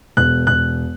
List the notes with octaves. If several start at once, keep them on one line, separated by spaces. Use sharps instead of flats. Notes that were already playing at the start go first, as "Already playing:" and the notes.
E1 F#6
E1 F#6